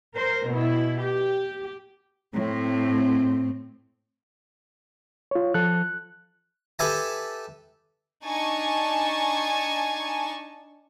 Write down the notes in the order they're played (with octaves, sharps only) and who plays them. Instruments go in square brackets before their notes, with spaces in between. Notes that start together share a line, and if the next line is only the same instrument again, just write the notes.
[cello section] A#4 C5
B2 E4
G4
A2 C4
[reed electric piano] F4 C#5
[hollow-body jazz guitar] F3 A4 [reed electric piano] F#6
[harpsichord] G4 A4 B4 E5 G#5 A5
[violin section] D4 D#4 G#5 A5 C#6